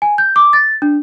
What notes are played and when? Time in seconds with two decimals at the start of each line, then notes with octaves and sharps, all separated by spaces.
0.02 G#5
0.18 G6
0.36 D6
0.53 A6
0.82 D4